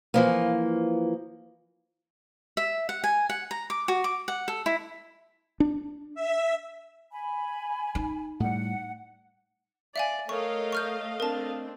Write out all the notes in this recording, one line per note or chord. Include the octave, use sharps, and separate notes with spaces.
E3 F3 A#3
E5
F#5
G#5
F#5
A#5
D6
F#4
D6
F#5
A4
E4
D4
E5
G#5 B5
D#4
A2 G3 F#5
D5 E5 F5 G#5
A3 A#4 C#5 D#5 F5 C#6
C#6 F6 G6
C4 D4 A#4 A5